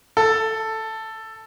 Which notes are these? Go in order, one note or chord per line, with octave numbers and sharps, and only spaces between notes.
A4